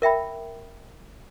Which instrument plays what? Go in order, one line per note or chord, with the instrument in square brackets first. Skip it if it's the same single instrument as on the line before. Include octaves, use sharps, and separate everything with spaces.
[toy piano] A#4 E5 G5 B5